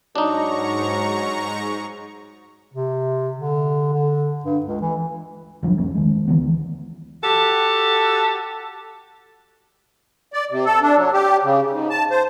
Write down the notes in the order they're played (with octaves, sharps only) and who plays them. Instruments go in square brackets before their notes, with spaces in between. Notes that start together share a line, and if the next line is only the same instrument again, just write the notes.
[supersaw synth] G#2 A#5 C#6 [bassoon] F#3 [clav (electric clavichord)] D4 D#4
[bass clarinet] C3
D3
D3
G2
C#2
E3
[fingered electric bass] E1 F3 F#3 D4
C2 F2 A#3 C#4
D#3 G#3
D2 E3 G#3 B3
[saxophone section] F#4 G4 A4
[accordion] D5
C3
A4
D4
F#3
G4
C#3
G#2
A5
C5